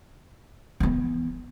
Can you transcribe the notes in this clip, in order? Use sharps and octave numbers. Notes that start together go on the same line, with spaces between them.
E3 B3